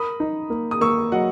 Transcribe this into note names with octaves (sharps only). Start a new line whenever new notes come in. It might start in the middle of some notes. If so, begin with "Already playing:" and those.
Already playing: A#4 B5 D#6
D#4
A#3
D#6
A#3 C#6 E6
F#3 D#5 F#5